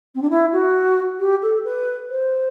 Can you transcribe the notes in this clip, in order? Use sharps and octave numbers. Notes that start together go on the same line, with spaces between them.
C4
D4
E4
F#4
G4
A4
B4
C5